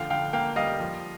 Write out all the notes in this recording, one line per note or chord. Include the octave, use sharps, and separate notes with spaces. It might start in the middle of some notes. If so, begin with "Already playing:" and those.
Already playing: D3 F3 A3 F5 G5
D3 F5 G5
A#3 F5 G5
G3 D#5 F5
F3